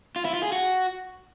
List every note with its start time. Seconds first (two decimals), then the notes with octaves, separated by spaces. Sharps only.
0.16 F4
0.25 E4
0.34 F4
0.43 G#4
0.52 F#4